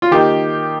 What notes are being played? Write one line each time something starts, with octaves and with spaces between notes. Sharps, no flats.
F4
D#3 A#3 D#4 G4